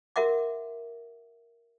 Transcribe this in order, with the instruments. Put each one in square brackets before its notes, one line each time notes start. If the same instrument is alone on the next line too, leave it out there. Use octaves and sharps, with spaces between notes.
[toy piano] F#4 A#4 E5 F#5 D6